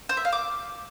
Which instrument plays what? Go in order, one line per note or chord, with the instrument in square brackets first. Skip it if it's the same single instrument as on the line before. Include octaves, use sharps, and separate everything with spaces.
[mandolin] C5
E5
F5
D6